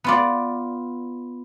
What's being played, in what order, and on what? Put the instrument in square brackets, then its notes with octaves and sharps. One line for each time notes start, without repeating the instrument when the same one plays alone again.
[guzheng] B3 F4 D5